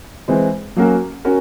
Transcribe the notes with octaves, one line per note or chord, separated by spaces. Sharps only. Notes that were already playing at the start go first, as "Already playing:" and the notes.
E3 G#3 C4
F#3 A#3 C#4 F#4 A#4
C#4 F#4 A#4